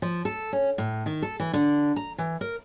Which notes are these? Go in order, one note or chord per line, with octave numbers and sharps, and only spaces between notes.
F3
A4
C#4
A2
D#3
A4
E3
D3
A#5
E3
A#4